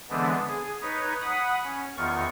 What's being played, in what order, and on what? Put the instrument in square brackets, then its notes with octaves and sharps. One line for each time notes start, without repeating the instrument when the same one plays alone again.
[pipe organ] D3 E3 G#3 B3 C4 D4
G#4
D#4 B4 C#5
F#5 B5 D#6
C#4
E2 D#3 F4 C#6